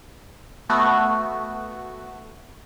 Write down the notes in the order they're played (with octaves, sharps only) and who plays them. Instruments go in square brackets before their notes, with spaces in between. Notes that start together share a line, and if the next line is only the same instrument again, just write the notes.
[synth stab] A3 B3 F#4